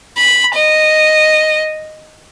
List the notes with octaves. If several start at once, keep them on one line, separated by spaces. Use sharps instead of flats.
B5
D#5